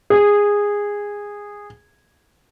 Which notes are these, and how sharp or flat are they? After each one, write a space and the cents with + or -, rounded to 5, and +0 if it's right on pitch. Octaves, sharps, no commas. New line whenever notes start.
G#4 -15